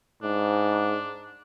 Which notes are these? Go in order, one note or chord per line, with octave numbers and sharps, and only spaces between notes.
G#2 D4